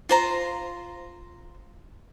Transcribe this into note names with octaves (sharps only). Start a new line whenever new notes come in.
F4 C5 A#5